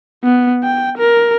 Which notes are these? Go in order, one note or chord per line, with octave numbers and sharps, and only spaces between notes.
B3
G5
A#4